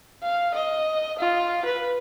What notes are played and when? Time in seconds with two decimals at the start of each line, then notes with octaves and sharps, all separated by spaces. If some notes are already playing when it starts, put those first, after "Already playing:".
0.23 F5
0.54 D#5
1.19 F4
1.65 B4